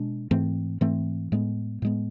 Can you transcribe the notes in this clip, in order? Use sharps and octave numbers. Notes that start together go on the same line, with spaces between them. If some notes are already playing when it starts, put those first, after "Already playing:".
Already playing: B2 G#3 D4
G#2 E3 A3 C4
G#2 E3 A3 C4
A2 G#3 B3
A2 G#3 B3